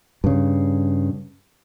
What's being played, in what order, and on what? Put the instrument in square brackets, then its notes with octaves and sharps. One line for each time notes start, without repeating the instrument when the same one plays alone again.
[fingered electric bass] G2 C#3